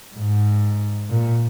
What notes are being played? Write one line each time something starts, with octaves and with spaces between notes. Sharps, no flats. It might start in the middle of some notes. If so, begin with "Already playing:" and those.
G#2
A#2